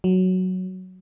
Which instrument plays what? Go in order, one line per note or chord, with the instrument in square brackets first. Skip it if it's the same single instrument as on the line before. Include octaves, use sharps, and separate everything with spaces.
[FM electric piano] F#3